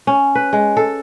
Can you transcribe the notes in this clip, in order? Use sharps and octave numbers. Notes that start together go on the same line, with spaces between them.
C#4
B4
G#3
A4